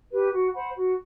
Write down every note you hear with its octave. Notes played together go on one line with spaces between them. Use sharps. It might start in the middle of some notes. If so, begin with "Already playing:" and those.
G4 B4
F#4
C5 F#5 B5
F#4